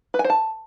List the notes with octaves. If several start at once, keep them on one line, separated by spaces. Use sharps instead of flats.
B4
G#5
C5
A5